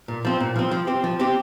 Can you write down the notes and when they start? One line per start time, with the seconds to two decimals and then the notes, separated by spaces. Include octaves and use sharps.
0.08 A#2
0.25 F3 C4
0.40 A#2
0.56 F3 C4
0.71 F3
0.87 C4 G4
1.04 F3
1.19 C4 G4